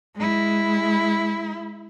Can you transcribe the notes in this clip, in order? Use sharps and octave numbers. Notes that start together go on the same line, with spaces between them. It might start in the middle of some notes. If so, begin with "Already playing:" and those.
G#3 E4